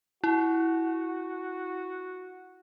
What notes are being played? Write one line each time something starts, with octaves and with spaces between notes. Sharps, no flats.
E4 F#4